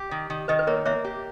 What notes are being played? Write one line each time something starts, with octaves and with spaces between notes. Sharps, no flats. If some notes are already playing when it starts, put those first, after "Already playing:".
Already playing: G4
D#3
D#3
D#3 B4 D#5
B4
A#3 A#4 C#5
A#3 C#5 E5
G4